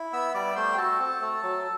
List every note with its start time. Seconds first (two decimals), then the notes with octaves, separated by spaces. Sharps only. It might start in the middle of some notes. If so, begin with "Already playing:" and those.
Already playing: E4
0.13 B3 E5 E6
0.34 G3 D5 D6
0.56 A3 C5 C6
0.73 G5
0.77 F#4 A4 A5
1.00 C4
1.21 A3
1.43 F#3